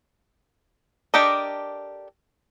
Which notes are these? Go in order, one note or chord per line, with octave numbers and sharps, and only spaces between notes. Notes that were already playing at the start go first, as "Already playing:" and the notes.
D4 G4 A4 A#4 D#5